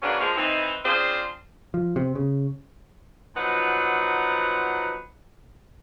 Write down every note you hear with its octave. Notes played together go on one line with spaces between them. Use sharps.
C#3 F#3 A#3 B3 C#4 D4
F3 G#3 A#3
E3 C4 D#4
C#3 C4 D4 F4 G#4 C5
F3
C3
C#3
A#2 F3 F#3 D#4 B4 F#5